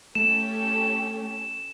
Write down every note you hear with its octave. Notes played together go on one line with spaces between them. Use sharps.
A3 C#4 G4 A4 E7